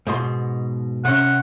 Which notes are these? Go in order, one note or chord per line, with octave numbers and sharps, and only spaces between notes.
G#2 B2 C6
C3 C#4 F#5